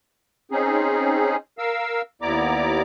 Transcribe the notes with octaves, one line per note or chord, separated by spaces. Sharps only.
C4 C#4 D#4 G#4
A#4 F5 E6
D#2 B3 E4 D5 A#5 D6